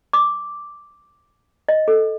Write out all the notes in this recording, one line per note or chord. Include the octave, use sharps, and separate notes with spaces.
D6
D#5
A4